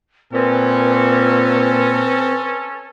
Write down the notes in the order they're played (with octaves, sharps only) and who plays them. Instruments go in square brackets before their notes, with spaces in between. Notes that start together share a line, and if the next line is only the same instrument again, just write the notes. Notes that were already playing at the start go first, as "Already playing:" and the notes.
[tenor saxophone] A#2 [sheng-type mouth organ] C4 [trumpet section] C#4 A4 [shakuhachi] B4